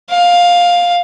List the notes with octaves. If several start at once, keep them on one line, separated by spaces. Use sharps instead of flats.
F5